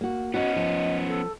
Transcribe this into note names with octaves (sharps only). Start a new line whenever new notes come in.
A#3 F#4
B3 C#4 F#4 D#5
F3
A4